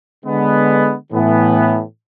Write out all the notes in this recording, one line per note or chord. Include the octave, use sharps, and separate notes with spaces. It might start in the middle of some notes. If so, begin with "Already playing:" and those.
D3 G#3 B3
A2 E3 B3